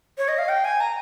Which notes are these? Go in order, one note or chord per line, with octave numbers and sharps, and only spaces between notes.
C#5
D#5
F5
G5
G#5
A#5